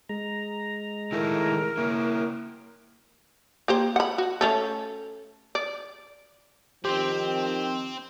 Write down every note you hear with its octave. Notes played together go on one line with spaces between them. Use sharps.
G#3 A#5
D#3 E4 A4 A#4
A#3 E4
A#3 G4 C5
F#5 B5
F#4
A3 C#4 A4
D5
D#3 F3 C4 G4 G5